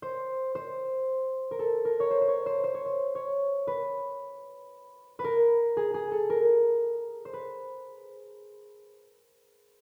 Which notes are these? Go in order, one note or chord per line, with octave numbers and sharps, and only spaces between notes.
C5
C5
A#4
A4
A#4
C#5
C5
C5
C#5
C5
C5
C#5
C5
C#5
B4
B4
A#4
G#4
G#4
A4
A#4
C5
B4